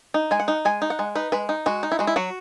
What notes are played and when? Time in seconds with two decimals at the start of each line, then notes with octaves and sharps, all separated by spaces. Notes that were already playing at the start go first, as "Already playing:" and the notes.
0.14 D#4
0.31 G#3 G#5
0.40 F#5
0.48 D#4
0.65 G#3 G#5
0.82 D#4
0.90 F#5
0.99 G#3
1.15 D#4 B4
1.32 G#3 B4
1.49 D#4
1.66 G#3 F#4
1.83 D#4
1.92 E4
1.99 G#3 F#4
2.07 E4
2.16 F#3 F#4